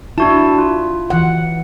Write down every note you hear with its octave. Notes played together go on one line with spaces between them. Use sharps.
D4 E4 F#4 A5
F4
E3 F#5